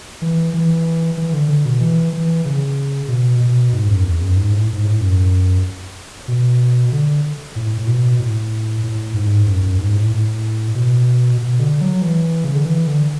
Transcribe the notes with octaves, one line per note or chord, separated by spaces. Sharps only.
E3
E3
E3
D3
D3
B2
E3
E3
C#3
B2
B2
G#2
F#2
E2
F#2
G#2
A2
G#2
A2
F#2
B2
D3
A2
A2
B2
A2
A2
G#2
F#2
F#2
G#2
A2
A2
B2
B2
D3
F#3
E3
C#3
D3
E3
D3